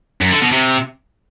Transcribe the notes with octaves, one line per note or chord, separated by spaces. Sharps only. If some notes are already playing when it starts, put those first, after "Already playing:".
F#2
D3
B2
C3